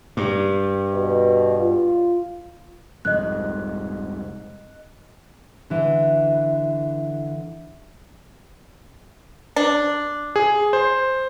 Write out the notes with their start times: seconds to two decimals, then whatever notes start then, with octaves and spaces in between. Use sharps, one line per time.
0.17 G2
0.94 B2
1.59 F4
3.05 C2 F2 G#2 D#5 F#6
5.70 D3 E3
9.56 D4
10.36 G#4
10.73 C5